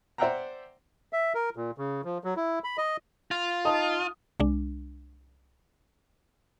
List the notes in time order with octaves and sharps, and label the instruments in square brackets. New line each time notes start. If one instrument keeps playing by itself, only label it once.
[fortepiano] C5 D5 E5 F#5 G5 A#5
[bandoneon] E5
A#4
A#2
C#3
F3
F#3
E4
B5
D#5
[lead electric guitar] F4
[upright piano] D#4 A5 D#6
[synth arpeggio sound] C2 G#3 D4